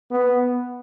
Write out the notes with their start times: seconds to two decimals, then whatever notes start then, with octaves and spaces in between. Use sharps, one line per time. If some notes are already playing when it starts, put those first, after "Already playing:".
0.12 B3